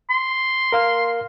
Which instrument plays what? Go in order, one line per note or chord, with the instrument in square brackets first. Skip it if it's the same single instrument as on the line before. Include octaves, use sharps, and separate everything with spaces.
[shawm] C6
[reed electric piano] A#4 F5 F6